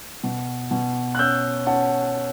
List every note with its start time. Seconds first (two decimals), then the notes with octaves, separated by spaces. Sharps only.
0.24 B2
0.71 B2
1.15 F#6
1.19 C#4 E6 G6
1.67 C#4 F#5 A5